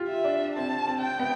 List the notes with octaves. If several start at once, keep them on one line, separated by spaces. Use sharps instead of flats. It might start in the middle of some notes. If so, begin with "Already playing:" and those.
Already playing: F4 G4
E5
D4
C4 A5
C4
G5
B3